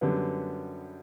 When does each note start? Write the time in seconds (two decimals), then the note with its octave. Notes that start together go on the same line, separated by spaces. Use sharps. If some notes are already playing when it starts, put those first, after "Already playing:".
0.01 F#2 D3 G3 B3